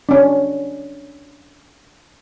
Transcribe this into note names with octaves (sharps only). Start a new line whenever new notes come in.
C#4 D4